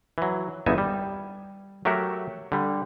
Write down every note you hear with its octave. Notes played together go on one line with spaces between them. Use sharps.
E3 F#3
G1 E2 B3 D#4 E5 G#5
G3
F#3 A3 G4 A#4 E5 F#5
D3 G3